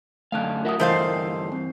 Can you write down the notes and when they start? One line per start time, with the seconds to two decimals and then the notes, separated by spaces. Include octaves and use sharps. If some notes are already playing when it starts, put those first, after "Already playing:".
0.32 F#2 D3 A3 F5 A5 F#6
0.65 F4 A#4 E5 F#5 D#6
0.80 G2 D3 E3 A3 A#4 C5 D#5 F5
1.52 C4